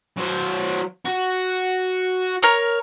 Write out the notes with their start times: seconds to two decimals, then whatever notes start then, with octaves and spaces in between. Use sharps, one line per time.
0.17 F#3 C5
1.05 F#4
2.43 A#4 C#5